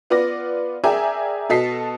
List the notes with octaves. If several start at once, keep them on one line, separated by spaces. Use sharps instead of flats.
B3 F4 B4 D5 A#6
G#4 A#4 D5 E5 G5 G#5
B2 F#4 A4 D#5 B6 C7